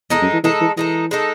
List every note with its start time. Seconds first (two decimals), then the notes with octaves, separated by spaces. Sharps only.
0.10 E2 G#3 D#4 A4
0.22 F#2
0.33 E3
0.44 E3 G#3 D#4 A4
0.61 E3
0.77 E3 G#3 D#4 A4
1.11 G#3 D#4 A4